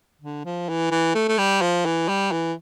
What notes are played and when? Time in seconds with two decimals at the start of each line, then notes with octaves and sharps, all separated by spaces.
0.21 D3
0.45 F3
0.69 E3
0.91 E3
1.15 A3
1.28 A3
1.38 G3
1.61 F3
1.85 E3
2.09 G3
2.32 E3